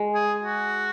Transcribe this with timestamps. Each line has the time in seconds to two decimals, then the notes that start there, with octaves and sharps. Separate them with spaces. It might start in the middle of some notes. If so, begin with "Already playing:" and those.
Already playing: G#3
0.14 G#4
0.42 F#4